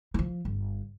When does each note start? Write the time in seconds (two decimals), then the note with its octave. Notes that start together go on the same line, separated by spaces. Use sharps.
0.14 E3 F3
0.45 G1